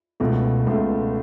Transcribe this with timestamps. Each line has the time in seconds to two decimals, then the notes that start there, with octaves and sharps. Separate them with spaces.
0.20 C#2 B2 A3
0.67 C#2 B2 A3